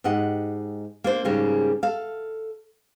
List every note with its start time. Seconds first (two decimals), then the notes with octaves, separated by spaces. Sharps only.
0.04 G#2 G4 D#5 F#5
1.04 A#3 D4 C5
1.25 G#2 C#3 G3 A#3 C#4
1.83 A4 F5